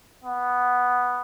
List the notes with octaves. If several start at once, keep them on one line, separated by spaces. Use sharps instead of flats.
B3